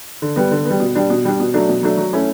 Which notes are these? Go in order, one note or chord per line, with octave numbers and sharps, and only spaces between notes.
D3
G3 B3
D3
G3 B3
B2
G3 D4
B2
G3 D4
B2
F#3 A3 D4
B2
F#3 A3 D4
F#3
A3 C#4 E4